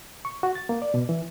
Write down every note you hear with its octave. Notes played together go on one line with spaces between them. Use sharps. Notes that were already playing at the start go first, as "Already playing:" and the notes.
C#6
F#4
A6
A#3
D5
B2
E3